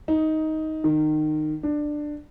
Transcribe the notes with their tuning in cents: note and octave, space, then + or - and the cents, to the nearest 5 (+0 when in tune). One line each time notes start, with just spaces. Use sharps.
D#4 +10
D#3 -20
D4 +15